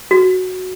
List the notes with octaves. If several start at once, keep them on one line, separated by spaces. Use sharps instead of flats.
F#4